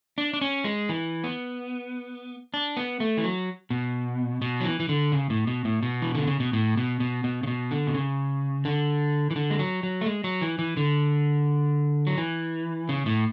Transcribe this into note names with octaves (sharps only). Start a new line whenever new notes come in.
D4
D4
C#4
G#3
E3
B3
D4
B3
A3
E3
F#3
B2
B2
F#3
E3
E3
D3
C#3
A2
B2
A2
B2
E3
D3
C#3
B2
A2
B2
B2
B2
C#3
B2
D3
B2
C#3
D3
E3
D3
G#3
F#3
F#3
A3
G#3
F#3
E3
E3
D3
F#3
E3
C#3
A2